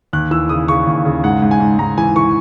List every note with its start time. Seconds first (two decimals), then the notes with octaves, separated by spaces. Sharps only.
0.13 D#2 F#6
0.31 E3 E6
0.49 C#3 D#6
0.68 C#3 C#6
0.87 D#2
1.05 C#3
1.24 G#2 F#5
1.42 G#2
1.51 G#5
1.60 G#2
1.79 G#2 A#5
1.98 E3 G#5
2.16 E3 C#6